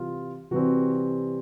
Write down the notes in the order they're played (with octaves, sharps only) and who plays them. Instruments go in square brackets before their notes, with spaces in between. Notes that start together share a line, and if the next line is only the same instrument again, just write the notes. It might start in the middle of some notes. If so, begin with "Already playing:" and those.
Already playing: [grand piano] C3 E3 G3 F4
C3 E3 G3 C4 F#4